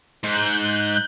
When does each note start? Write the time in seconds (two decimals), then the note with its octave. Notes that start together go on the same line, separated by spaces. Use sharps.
0.23 G#2 F#6 G6